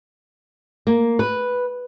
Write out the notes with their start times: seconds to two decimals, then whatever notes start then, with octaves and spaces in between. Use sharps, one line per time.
0.87 A#3
1.19 B4